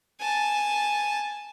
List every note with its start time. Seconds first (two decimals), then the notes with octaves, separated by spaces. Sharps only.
0.20 G#5 A5